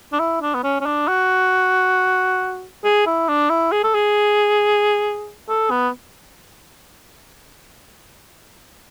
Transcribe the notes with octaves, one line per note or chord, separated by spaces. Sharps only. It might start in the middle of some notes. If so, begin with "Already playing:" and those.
D4
E4
D4
B3
C#4
C#4
D4
F#4
G#4
E4
D4
E4
G#4
A4
G#4
A4
B3